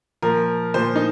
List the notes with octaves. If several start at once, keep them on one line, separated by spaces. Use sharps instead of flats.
A#2 F3 A#4
A#2 F3 C5
D#4